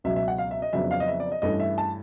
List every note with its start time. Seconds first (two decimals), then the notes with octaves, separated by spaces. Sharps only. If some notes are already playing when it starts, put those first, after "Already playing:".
0.04 C#2 B2 F#3 E5
0.16 E5
0.28 F#5
0.38 F5
0.51 E5
0.62 D#5
0.73 F2 C#3 F#3 B3 D4 E5
0.91 F5
1.00 D#5
1.08 E5
1.20 D5
1.32 D#5
1.42 G2 E3 A3 C#4 D#5
1.60 E5
1.78 A5